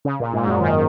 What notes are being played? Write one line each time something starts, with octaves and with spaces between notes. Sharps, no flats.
C#3
A#2
G#2
G#2
F#2
D#3